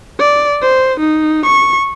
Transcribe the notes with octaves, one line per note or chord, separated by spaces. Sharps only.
D5
C5
D#4
C#6